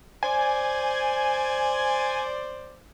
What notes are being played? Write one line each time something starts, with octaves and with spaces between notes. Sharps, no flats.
C5 D5 G#5